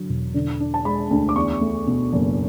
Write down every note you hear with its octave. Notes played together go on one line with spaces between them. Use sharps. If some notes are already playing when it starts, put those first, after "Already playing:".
Already playing: D3 F#3
E1
D3
D4
A5
G#3 B5
D2
D6
E2 C#6
A3
B2
F#1